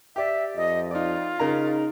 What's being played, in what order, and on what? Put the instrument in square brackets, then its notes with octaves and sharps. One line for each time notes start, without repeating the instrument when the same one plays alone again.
[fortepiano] G4 D5 [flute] E5
[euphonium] F2 [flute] D#5
[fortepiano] D#4 D5 [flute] F4
[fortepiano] C#3 A#4 A#5 [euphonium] D#4